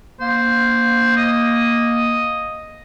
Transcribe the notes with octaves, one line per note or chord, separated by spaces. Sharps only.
A#3 C5
D#5